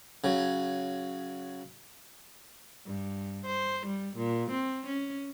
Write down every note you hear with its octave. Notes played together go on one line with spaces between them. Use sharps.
C#3 F#3
G2
C5
G3
A#2
C4
C#4